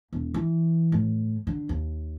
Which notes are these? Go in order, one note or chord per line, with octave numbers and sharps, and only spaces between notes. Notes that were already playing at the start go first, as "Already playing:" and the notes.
E1
E3
A2
D3
D#2